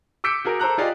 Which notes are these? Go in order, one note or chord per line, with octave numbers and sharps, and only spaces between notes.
D6 E6 G6 B6 C#7 D7
F#4 G#4 A#4
A4 C5 A#5 F#6
F4 G4 G#4 D5 D#5 F5